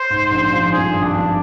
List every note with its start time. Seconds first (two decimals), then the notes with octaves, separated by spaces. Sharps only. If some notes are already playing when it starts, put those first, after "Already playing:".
Already playing: C5
0.10 G#2
0.31 A#1
0.52 F3
0.72 G2 G#4
0.94 G#1
1.04 D4
1.14 F3